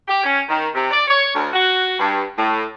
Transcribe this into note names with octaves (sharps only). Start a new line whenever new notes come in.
G4
C#4
D#3
C3
D5
C#5
D2
F#4
G2
A2